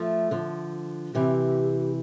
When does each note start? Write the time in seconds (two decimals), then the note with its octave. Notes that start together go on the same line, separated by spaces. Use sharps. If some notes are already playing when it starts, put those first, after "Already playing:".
Already playing: F3 A3
0.31 D3 F3
1.14 C3 E3 G4